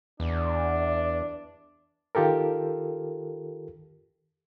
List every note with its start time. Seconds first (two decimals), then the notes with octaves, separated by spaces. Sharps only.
0.20 E2 D4
2.15 D#3 F4 G4 A4 A#4